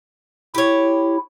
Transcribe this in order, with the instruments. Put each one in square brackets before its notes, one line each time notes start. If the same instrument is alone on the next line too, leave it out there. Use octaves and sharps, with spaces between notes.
[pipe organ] E4 [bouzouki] G4 C#5